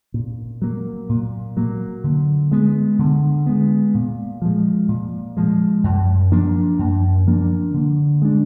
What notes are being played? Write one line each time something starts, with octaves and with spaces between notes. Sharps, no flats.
A#2
F#3 A#3
A#2
F#3 A#3
D3
G#3 B3
D3
G#3 B3
A#2
F3 G#3
A#2
F3 G#3
F#2
F3 A#3 D4
F#2
F3 A#3 D4
D3
G#3 D4